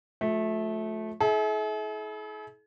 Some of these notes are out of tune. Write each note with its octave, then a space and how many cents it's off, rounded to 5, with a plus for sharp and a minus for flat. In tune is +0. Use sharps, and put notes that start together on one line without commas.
F3 +35 A3 -15
E4 -30 G#4 +45